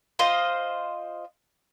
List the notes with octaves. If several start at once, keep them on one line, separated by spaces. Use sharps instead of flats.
F4 C5 D#5